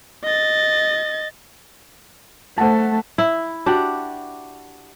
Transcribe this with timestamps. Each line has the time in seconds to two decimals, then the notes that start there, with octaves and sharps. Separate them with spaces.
0.24 D#5 A6
2.58 A3 C5 F#5 A5
3.18 E4
3.66 D4 F#4 G4